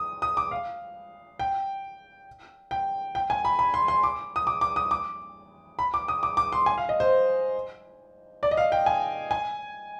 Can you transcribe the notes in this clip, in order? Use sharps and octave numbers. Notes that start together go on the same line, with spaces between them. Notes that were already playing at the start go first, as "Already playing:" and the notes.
Already playing: D#6
D#6
D6
F5
G5
G5
G5
G#5
B5
B5
C6
C6
D6
D#6
D6
D6
D#6
D6
B5
D6
D#6
D6
D6
C6
G#5
F5
D#5
C5
D5
D#5
F5
G5
G#5
G#5